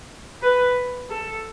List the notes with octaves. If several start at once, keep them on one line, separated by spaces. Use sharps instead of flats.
B4
A4